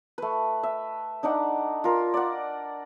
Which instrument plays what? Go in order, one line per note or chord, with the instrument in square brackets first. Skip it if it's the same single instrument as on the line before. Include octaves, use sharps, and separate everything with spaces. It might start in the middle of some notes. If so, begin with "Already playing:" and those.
[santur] A3 B4
E5
D4 D#4 D5 F#5
F4 A#4
D5 F#5